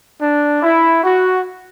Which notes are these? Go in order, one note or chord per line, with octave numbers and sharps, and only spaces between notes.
D4
E4
F#4